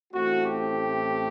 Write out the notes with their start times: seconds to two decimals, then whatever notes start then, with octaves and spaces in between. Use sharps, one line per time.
0.14 A1 A2 A3 C4 F#4
0.45 G4